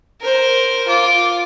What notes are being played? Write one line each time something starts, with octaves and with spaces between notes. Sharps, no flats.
A#4 C5
F4 D6